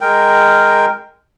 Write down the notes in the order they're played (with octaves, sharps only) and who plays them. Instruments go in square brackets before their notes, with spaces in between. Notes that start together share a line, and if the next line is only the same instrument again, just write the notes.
[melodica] G#3 A#4 G5